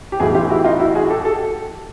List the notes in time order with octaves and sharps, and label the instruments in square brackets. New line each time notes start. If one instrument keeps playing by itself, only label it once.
[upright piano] G4
B1 A2 E3 F#4 G#4
F4 G4
E4 F#4
D#4 F4
E4 F#4
F#4 G#4
G4 A4
A4